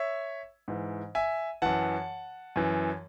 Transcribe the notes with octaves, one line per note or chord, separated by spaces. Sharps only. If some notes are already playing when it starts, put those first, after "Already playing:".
Already playing: C#5 E5
G#2 E3
E5 G#5
F#2 E3 F#5 A5
F#2 E3